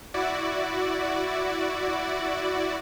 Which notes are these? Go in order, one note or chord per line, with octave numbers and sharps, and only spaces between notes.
E4 F#4 D5